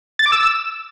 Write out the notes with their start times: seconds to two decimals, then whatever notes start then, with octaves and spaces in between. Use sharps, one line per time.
0.19 A6
0.26 D6
0.32 E6